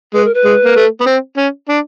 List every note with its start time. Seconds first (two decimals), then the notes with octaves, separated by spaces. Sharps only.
0.14 G#3 B4
0.25 A#4
0.34 B4
0.45 G#3
0.65 A#3
0.76 A3
1.01 B3
1.06 C4
1.37 C#4
1.69 D4